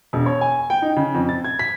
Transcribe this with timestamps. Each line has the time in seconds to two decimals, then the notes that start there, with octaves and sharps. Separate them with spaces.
0.13 E1
0.26 C#5
0.41 G#5
0.70 G5
0.82 D#4
0.96 C#3
1.14 F2
1.29 A6
1.44 G#6
1.59 B6